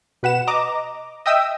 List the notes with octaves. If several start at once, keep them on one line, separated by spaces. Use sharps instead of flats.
B2 B4 F#5 E7
D#5 A#5 D6
D#5 E5 G5 D#6 E6